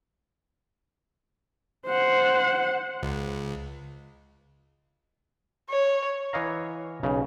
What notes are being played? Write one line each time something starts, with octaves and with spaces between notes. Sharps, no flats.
C5 F#5
C#2
C#5
E3 C#5 D#5 F5 A#5
B1 C#3